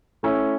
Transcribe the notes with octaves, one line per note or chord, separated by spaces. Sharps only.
A3 C#4 E4